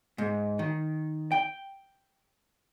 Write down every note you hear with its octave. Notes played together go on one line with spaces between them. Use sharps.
G#2
D#3
G5